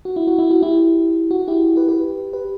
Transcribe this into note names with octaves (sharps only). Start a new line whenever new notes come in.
F#4
E4
F#4
E4
F#4
E4 G4
F#4
E4 G4
G4 B4
G4 B4
G4 B4